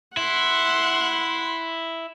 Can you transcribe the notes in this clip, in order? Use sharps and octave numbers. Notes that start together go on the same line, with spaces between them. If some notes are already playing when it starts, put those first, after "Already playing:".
E4 F#5 C6